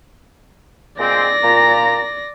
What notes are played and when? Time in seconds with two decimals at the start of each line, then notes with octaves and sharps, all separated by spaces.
0.99 A#2 G#3 C4 D5 A#6
1.44 A#2 A#5